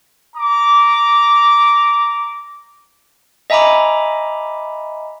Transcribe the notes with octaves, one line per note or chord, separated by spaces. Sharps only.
A#5 D6
D#5 E5 G#5 A#5 B5 D6